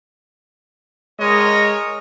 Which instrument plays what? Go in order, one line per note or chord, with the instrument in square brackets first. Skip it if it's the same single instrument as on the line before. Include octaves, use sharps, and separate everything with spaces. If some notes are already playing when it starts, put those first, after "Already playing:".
[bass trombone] G#3 [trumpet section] A#4 C#5 D#5